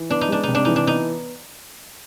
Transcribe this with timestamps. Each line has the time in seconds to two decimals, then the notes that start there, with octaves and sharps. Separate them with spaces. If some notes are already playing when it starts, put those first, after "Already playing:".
Already playing: E3
0.10 B3 D4
0.21 D#4
0.29 G#3 D4
0.43 C3 D#4
0.55 D4
0.65 E3 D#4
0.76 D4
0.86 B3 D#4